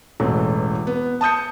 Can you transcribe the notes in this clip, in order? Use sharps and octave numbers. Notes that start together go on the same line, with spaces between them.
E1 A1 E3 A3
B3
A5 D#6 G6 C#7